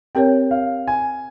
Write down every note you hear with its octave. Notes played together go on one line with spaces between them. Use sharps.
C4 G4 A#4 C#5 G5
F5
G#5